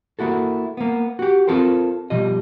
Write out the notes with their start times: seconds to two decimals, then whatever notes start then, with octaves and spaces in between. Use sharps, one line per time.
0.19 A#3 E4 F#4 A4
0.77 A#3 B3
1.19 F#4 G4
1.47 C4 F4 A4 A#4 C5
2.10 B2 F3 G3 D#5